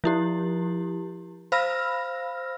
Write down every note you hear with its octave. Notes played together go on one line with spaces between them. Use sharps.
F3 E4 G4
C5 F5 B5 E6 F6 A#6